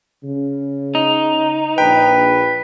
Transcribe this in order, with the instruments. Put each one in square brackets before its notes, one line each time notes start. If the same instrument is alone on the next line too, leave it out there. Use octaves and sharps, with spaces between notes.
[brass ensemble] C#3
[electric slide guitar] D#4
[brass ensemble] A#1 [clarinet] B4 [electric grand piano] G5